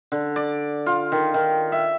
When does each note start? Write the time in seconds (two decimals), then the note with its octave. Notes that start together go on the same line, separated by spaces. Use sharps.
0.12 D3
0.36 D5
0.86 F4
1.12 D#3
1.34 D#3
1.72 E5